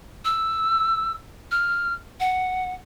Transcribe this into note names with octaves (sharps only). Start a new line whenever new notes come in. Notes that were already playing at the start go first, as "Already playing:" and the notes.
E6
F6
F#5